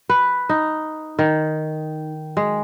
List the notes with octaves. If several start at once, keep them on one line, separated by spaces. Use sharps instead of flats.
B4
D#4
D#3
G#3